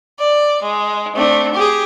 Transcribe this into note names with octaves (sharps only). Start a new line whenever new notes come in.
D5
G#3
A3 C4 D4
G4 G#4